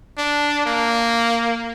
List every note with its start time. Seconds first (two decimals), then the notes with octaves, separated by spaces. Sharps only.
0.18 D4
0.66 A#3